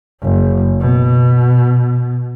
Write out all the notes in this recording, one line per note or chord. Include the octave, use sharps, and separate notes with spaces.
F#1
B2